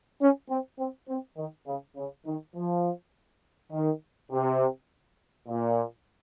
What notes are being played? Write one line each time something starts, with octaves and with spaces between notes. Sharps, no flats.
C#4
C4
C4
C4
D#3
C#3
C#3
D#3
F3
D#3
C3
A#2